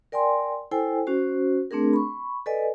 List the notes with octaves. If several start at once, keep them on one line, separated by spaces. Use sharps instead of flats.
A#4 D5 G5 G#5 C6
E4 A4 C5 G5 G#5
C#4 F#4 C5
A3 C4 D4 G#4 A#4
B5 C#6
A4 B4 D5 D#5 G#5